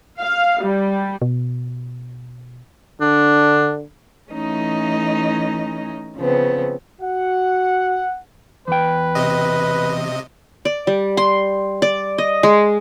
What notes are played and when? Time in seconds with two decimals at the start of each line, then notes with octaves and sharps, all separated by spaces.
0.18 F5
0.62 G3
1.22 B2
3.01 D3 D4
4.31 E3 A3 C#4 D#4 D#5
6.16 C#3 F3 B3 C4
7.01 F#4 F#5
8.68 E2 B4 G5
9.15 C3 D#5
10.65 D5
10.87 G3
11.17 C6
11.82 D5
12.18 D#5
12.43 G#3